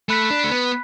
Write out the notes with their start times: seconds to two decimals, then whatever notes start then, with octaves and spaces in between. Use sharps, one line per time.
0.09 A3 B5 F#6 B6
0.31 D4
0.44 A3
0.51 B3